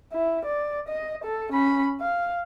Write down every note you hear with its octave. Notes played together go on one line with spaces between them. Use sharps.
E4
D5
D#5
A4
C#4 B5
F5